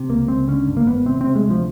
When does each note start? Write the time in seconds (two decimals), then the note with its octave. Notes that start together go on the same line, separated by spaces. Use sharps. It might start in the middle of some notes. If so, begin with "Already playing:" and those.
Already playing: C3
0.09 C#2 A#3
0.28 C#2 C4
0.48 D3 C#4
0.67 G2
0.77 A#3
0.87 G#1 B3
1.06 C3 C4
1.21 C3 C4
1.35 G#3
1.45 D2
1.50 F3